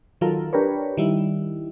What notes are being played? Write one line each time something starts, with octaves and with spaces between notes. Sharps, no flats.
D#3 F#3 F4 A4 A#4
D4 G4 A#4 B4 C#5
D#3 G3 E4